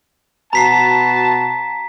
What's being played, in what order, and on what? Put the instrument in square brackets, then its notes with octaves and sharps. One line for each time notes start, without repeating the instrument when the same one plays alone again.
[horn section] B2 F#4 A5 [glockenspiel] A#5 B6 C7